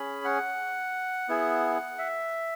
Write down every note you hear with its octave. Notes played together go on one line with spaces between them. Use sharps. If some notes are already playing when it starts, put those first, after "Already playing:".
Already playing: C#4 G#4 B5
F#5
B3 E4 G#4
E5